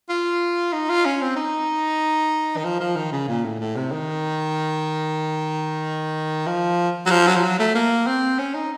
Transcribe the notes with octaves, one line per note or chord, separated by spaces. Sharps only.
F4
D#4
F4
C#4
C4
D#4
D#3
F3
F3
D#3
C#3
A#2
A2
A2
C3
D#3
F3
F#3
F3
F#3
F3
F#3
A3
A#3
C4
C#4
D#4